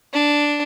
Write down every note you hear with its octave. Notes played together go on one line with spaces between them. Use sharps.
D4